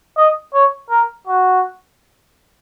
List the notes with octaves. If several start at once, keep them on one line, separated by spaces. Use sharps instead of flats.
D#5
C#5
A#4
F#4